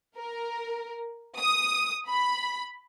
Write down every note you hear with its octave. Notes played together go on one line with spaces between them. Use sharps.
A#4
D#6
B5